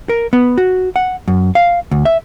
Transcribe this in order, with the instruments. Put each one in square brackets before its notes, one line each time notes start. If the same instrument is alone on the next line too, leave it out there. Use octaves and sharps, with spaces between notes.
[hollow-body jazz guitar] A#4
B3
F#4
F#5
F#2
F5
D2
E5